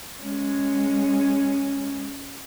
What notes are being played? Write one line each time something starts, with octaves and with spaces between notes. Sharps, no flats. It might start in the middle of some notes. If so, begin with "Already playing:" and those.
G#3 C#4